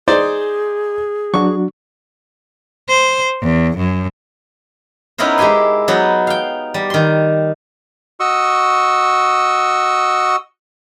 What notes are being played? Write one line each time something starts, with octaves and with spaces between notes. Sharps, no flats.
D#4 G#4 C5 D5
F#3 D4 F#4 C#6
C5
E2
F#2
B3 C#4 D#4 E4 A#4 C5
G#3 E4 G4 G#5 C6
F#3 B3 D#4
F5 G5
G3
D#3 C6
F#4 D#5 C#6 E6